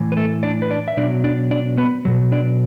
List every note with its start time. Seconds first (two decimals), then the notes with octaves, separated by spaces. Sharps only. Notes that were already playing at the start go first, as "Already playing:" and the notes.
Already playing: A2 E3
0.12 B4
0.17 A3 A4
0.43 D4 D5
0.62 B4
0.71 D4 D5
0.88 E5
0.97 B2 F#3 D4 D5
1.24 D4 D5
1.51 D4 D5
1.77 B3 B4
2.05 B2 F#3
2.32 D4 D5